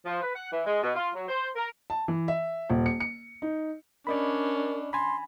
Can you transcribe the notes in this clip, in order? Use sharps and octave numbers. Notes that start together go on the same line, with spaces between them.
F3
B4
F#5
E3
G#3
B2
F4
F#3
C5
A#4
A5
E3
E5
D#1
C#7
C#7
D#4
C#4 D4 A#4 D5 D#5 B5
G#5 B5 C6